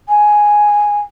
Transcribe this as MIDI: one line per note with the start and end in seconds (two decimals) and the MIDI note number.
0.09 1.00 80